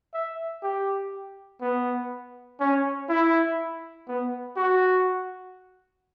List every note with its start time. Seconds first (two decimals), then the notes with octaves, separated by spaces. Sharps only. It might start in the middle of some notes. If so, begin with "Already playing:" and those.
0.14 E5
0.63 G4
1.61 B3
2.60 C#4
3.09 E4
4.08 B3
4.57 F#4